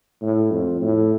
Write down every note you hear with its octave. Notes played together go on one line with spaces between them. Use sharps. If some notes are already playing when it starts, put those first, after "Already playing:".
A2
F2
A2